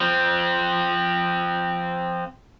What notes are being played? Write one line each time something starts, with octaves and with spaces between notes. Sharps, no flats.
F3 C4